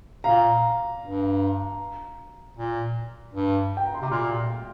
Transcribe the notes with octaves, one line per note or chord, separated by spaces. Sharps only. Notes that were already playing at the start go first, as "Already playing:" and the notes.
A#2 F5 A#5
G2
A#2
G2
G5
A#5
C6
C3 D6
A#2 C6 F6